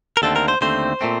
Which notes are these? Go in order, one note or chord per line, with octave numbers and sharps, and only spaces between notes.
A#4
D#2 D3 A3 C4 A4
A#4
C5
D#2 D3 A3 C4 C5
A#2 A3 C4